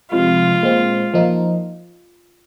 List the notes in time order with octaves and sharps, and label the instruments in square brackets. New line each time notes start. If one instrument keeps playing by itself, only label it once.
[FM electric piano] C3 F3 G#3 [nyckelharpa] F4
[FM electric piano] A#2 G#3 C4
F3 A#3 D#4